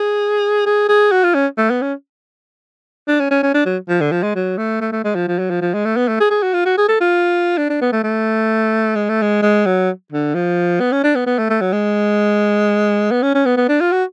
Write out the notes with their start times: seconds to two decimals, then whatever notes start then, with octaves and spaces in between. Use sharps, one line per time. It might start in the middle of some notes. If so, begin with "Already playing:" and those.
Already playing: G#4
0.66 G#4
0.89 G#4
1.12 F#4
1.23 F4
1.34 C#4
1.58 A3
1.70 B3
1.81 C#4
3.08 D4
3.20 C#4
3.31 C#4
3.43 C#4
3.54 D4
3.65 F#3
3.88 F3
4.01 D3
4.12 F3
4.23 G#3
4.35 F#3
4.58 A3
4.81 A3
4.92 A3
5.04 G#3
5.15 F3
5.28 F3
5.39 F#3
5.50 F3
5.61 F3
5.74 G#3
5.85 A3
5.96 B3
6.08 A3
6.20 G#4
6.31 G#4
6.43 F#4
6.53 F4
6.65 F#4
6.78 G#4
6.88 A4
7.00 F4
7.57 D4
7.69 D4
7.81 B3
7.92 A3
8.03 A3
8.95 G#3
9.09 A3
9.22 G#3
9.42 G#3
9.66 F#3
10.12 D3
10.34 F3
10.80 B3
10.92 C#4
11.03 D4
11.15 B3
11.26 B3
11.38 A3
11.49 A3
11.61 F#3
11.73 G#3
13.11 B3
13.22 C#4
13.34 C#4
13.45 B3
13.57 B3
13.69 D4
13.80 F4
13.92 F#4